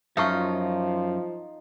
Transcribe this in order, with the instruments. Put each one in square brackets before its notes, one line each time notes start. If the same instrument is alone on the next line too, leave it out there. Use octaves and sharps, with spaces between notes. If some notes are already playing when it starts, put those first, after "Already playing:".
[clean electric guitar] F#2 [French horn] F3 [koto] D#4 F4 [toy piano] E5 A5 C#6